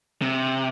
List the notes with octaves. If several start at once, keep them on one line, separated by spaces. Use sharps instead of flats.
C3